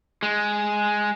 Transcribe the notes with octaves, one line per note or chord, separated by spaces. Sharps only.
G#3